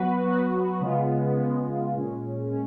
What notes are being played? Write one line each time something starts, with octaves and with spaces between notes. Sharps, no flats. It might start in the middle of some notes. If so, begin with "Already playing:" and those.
Already playing: F#3 B3 F#4 B4
F#3 B3 F#4 B4
C#3 G#3 B3 F4
C#3 G#3 B3 F4
A#2 G#3 C#4
A#2 G#3 C#4